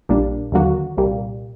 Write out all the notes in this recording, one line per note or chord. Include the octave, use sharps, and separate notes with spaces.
A#1 A#2 G3 A#3 D4
D#2 D3 F#3 A#3 F#4
C2 A#2 G3 A#3